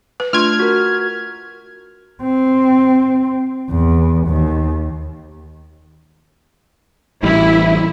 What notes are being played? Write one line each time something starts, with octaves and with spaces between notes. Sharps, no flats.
B4
A3 D4 F4 C6 F6 G#6
F#4 A#4
C4
E2
D#2
A1 E3 G3 E4